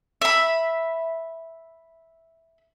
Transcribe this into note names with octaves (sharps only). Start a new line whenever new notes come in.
E5 B5